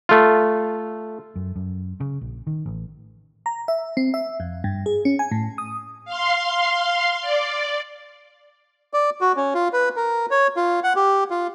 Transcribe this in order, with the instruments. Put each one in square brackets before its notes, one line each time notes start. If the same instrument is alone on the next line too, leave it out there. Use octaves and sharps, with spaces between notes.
[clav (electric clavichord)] A3 F4
[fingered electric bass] F#2
F#2
C#3
A#1
D#3
A1
[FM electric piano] A#5
E5
C4
E5
F2
G2
G#4
C#4
G#5
A2
D#6
[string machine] F5 C6
D5
[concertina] D5
F#4
C#4
F4
B4
A#4
C#5
F4
F#5
G4
F4